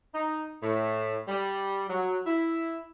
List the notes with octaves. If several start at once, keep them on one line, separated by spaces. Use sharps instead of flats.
D#4
A2
G3
F#3
E4